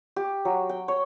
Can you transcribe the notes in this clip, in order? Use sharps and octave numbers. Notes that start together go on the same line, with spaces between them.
G4
F#3
G5
C#5